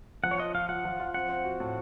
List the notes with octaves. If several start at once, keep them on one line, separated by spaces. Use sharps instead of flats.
F3 F#5
C#5
F4 D#5
F4 F5
F4 F#5
F3
F4
C4 F#5
C4
F#4
A2